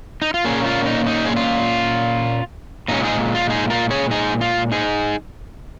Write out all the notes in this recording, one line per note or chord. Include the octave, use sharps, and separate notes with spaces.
D#4
F4
A#2 A#3 C#4 G#4
F4
D#4
D#4
G#4
F4
A#2 G#3 C#4 D#4
D#4 G#4
F4
D#4 G#4
F4 A#4
G#4 C#5
D#4 G#4
F4
D#4 G#4